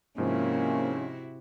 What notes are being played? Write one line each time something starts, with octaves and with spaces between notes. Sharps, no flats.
G#2 C3 F3 A#3 C#4 E4 F#4